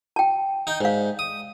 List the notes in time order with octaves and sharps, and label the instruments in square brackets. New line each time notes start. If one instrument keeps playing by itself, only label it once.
[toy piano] G5 A5
[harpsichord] D#4 G5
[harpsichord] G#2 [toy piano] D5 F5
[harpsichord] D#6